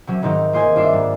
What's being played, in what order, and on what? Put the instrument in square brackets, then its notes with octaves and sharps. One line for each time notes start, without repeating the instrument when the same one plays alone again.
[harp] C3 F#3 C#4
G#2 C3 D#3 C4 D#4 G4
A#3 F4 C5 D#5 G#5
G2 D4 F4 E5 D6 C7
G#2 G3